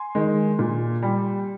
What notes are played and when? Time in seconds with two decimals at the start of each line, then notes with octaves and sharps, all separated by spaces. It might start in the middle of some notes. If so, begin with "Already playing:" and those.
Already playing: G#5 C6
0.15 D#3 G#3
0.59 A#2
1.02 G3